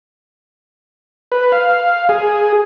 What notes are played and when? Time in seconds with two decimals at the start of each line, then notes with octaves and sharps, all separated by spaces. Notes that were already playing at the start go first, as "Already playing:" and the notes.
1.32 B4
1.52 F5
2.09 G#4